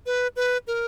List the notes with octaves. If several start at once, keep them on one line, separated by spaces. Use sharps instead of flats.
B4
B4
A#4